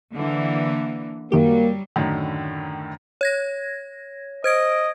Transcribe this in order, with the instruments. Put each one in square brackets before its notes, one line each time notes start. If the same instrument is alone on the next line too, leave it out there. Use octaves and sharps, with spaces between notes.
[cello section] D3 E3 A#3
[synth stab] F#2 D#3 G4 [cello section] F#3 G3 [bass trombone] A#3
[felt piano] F#2 A2 D3 D#3
[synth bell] C#5 G#6 A#6
[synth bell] C5 G#6 D7 [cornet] D#5